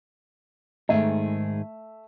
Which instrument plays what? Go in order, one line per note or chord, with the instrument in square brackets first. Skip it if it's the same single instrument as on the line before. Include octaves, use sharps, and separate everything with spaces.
[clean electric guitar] G#2 D#3 G#4 [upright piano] A3 E5